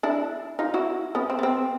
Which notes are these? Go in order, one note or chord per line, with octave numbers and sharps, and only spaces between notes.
D4 E4
D#4 F4
E4 F#4
B3 C#4
C4
B3
C4